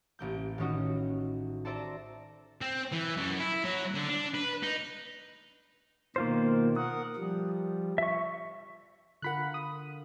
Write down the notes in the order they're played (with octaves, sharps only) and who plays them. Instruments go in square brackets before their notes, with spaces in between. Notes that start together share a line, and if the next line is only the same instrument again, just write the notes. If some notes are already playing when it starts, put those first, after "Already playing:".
[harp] A1 A#3 G6
A2 D#3 C#4 D#4 F#4
A4 C5 D5 E5 A5 A#5
[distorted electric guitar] C4
E3
F#2
E4
F#3
D3
D4
B4
D#4
[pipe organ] B2 D#3 [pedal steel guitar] A#3 F4 C5
[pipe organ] A#4 F#5 [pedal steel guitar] D#6
[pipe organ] F3 G3
[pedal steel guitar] E5 C#6
[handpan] D3 F4 A#4 [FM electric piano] F#5 B5 F#6
[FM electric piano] D#6